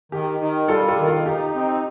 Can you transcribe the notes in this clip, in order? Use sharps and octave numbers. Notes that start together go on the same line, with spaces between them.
D#3 G4
D#3
G3 F4 A4
F4 A4
D#3
F4
D#4 G4
C4